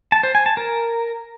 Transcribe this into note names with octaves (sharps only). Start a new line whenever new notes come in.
A5
C5
G#5
A5
A#4